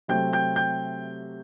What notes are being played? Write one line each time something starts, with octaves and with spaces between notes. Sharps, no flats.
C3 F#3 A3 C4 G5 G6
G5 G6
G5 G6